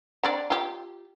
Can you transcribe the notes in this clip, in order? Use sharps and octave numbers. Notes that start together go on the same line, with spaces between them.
C4 D4 D5
F4 G4